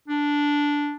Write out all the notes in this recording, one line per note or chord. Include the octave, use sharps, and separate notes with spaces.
D4